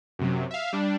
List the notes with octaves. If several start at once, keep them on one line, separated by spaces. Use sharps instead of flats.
F#2 C3 F#3
E5 F5
G3 D4